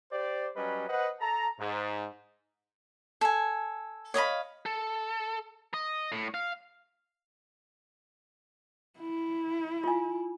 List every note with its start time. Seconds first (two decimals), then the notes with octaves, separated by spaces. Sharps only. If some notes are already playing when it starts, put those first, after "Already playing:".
0.12 G4 C5 D5
0.56 F#3 G3 C#4 B4 D#5
0.88 B4 C5 D#5 F#5
1.21 A4 A5 A#5
1.60 G#2
3.21 A4 G#5
4.14 C#5 D#5 F5 B5
4.66 A4
5.74 D#5
6.12 A2
6.34 F5
8.99 E4
9.84 F4 G#5